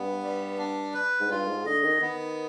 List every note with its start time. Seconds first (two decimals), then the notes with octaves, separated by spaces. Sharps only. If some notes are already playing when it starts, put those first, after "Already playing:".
Already playing: G2 B3
0.23 G3
0.58 D4
0.94 B4
1.20 G#2
1.30 G2 F4
1.48 G#2
1.66 D3 D#5
1.84 D#3
2.01 D#3 B3